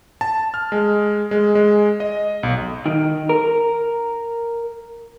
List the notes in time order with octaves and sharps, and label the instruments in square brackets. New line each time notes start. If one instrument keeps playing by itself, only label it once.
[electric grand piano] A5
F6
G#3
G#3
G#3
D#5
B1
[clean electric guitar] D#3
A#4